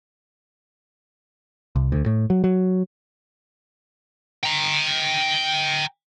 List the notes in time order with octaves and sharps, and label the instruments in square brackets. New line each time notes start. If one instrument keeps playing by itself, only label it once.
[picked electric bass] C2
D2
A2
F#3
F#3
[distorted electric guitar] G5 A#5